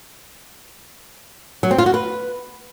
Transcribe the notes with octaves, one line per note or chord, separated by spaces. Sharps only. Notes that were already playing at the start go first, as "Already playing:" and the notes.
F#3
C4
F4
F#4
B4